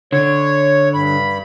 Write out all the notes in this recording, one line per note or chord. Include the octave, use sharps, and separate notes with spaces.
D3 C#5
G2 B5